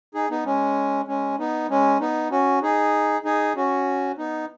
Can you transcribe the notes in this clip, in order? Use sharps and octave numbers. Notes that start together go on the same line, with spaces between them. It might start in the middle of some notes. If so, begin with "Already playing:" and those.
D#4 G#4
B3 D#4
G#3 C#4
G#3 C#4
B3 D#4
G#3 C#4
B3 D#4
C#4 F#4
D#4 G#4
D#4 G#4
C#4 F#4
B3 D#4